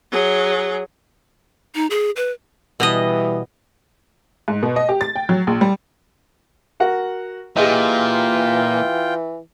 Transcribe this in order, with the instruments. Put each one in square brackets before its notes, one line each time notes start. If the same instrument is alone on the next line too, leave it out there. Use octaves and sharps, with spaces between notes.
[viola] F#3 G#4
[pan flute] D#4
G#4
B4
[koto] B2 B3 D#5 [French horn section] E3 G3
[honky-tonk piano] G#2
B2
D#5
G4
A6
G5
F#3
A#1
G3
[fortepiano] F#4 A#4 F#5
[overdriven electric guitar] A#2 [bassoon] E3 [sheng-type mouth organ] F4 G5 [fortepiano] G4 G#4 D#5